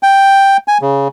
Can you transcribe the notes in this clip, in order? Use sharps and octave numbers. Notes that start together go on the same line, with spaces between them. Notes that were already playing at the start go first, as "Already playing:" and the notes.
G5
G#5
C#3